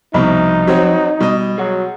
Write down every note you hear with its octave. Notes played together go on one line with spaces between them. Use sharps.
C2 B2 F3 D#4
F#3 C4 F#4
B2 G3 D#5
F#3 G#4 F#5